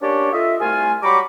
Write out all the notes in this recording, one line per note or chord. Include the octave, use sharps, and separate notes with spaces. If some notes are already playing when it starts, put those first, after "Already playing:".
A#3 C#4 D4 G4 C#5 D5
F4 A4 D#5 E5
C2 A3 F4 G#5
F#3 G3 A#5 B5 C#6 D6